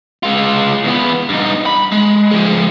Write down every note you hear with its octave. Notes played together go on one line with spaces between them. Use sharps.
G#3 F4
E2 B3
G2 D#4
B5
G#3
F3 G#3